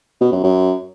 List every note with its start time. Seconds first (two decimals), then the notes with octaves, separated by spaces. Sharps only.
0.21 B2
0.32 F#2
0.44 F#2